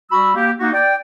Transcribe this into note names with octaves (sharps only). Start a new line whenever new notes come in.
G3 F#4 B5 C#6 E6
A#3 G4
A#3 D#4 F#4
D5 G5